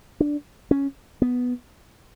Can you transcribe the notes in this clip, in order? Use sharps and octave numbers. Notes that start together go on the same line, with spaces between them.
D4
C#4
B3